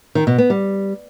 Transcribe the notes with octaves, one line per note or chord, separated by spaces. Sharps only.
D#3
B2
B3
G3